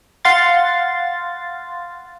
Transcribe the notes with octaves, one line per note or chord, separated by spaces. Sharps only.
F5 F#5 C6 A6